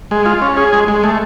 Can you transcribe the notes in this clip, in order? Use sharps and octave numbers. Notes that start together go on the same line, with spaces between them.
G#3
F4
C#4
G#4
G#3
G#3
A3